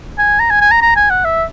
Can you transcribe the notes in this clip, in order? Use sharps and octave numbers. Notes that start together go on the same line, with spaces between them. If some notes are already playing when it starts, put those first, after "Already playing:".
G#5
A#5
G#5
G#5
A#5
A#5
G#5
F#5
E5